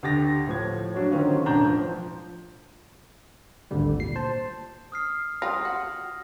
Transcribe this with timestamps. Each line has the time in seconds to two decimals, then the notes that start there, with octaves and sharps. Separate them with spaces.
0.03 D2 G4 A6 A#6
0.47 A2 F3 G#6
0.94 F#3 D4 F#4 C#5
1.11 D3 D#3 C4 C#4 F4
1.45 E1 A2 D4 A#5 G6
1.65 F3
3.71 G#1 D2 D3 G3
3.97 A#2 C7
4.16 C5 A5
4.92 D#6 F6 C7
5.42 G3 F4 D#6 A#6
5.65 F#4